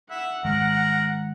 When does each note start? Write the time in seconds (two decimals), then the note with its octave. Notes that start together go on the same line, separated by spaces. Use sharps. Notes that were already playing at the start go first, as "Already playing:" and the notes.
0.11 E5 F#5
0.45 D#3 G#3 A#4